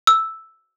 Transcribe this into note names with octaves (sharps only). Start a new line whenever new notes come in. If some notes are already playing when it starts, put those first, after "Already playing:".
E6